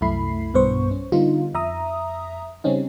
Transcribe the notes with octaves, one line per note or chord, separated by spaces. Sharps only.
C2 F#2 A3 E4 B5 C7
B1 G2 B3 C5 C#6
C#4
D3 G3 B3 D#4 F4
F2 E5 A#5 D#6
C#3 G3 C4 C#4 D#4